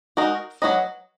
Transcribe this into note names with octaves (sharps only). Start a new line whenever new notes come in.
G#3 D#4 F#4 A#4
F#3 C#4 F#4 B4 D#5